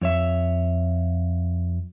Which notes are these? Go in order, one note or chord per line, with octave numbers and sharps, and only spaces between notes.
F2 C#5 E5